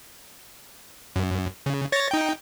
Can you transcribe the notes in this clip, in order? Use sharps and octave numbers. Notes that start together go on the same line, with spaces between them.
F#2
C#3
C#5 A6 A#6
D#4 G5